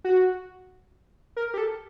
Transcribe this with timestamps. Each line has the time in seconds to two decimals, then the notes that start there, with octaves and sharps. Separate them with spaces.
0.04 F#4
1.37 A#4
1.54 G4
1.58 A4